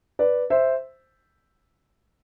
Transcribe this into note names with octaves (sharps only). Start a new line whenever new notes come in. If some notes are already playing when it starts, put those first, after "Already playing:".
B4 D5
C5 E5